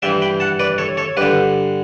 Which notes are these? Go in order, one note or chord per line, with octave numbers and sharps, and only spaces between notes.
G2 E3 E5 G5
G5 B5
F#5 A5
B4 D5
A4 C#5
A4 C#5
G2 D3 G4 B4